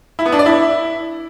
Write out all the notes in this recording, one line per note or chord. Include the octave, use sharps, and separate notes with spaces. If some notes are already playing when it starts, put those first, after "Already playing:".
E4
B3
D4
D5
E4